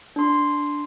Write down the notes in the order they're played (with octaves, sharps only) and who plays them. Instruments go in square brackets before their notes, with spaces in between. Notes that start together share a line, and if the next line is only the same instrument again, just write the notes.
[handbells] D4 C6